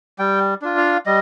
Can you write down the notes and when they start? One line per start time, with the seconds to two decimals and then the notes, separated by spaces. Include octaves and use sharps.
0.19 G3 G5
0.62 D4 F4
0.77 F5
1.06 G3 D#5